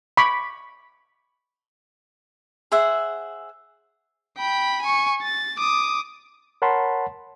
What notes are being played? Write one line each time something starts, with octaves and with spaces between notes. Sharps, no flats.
B5 C#6 D6
G#4 C5 E5 F#5
G5 B5
G#5 C#6
A6
D6 D#6
A#4 C#5 F#5 A5 B5 C6